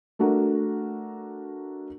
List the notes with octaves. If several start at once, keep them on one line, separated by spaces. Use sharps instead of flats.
A3 D4 F#4 A#4